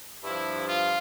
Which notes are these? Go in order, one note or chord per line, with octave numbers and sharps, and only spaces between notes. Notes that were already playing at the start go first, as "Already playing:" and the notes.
G2 F3 E4
F4